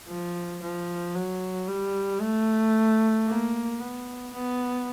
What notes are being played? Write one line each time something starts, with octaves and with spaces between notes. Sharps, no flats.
F3
F3
F#3
G3
A3
A#3
B3
B3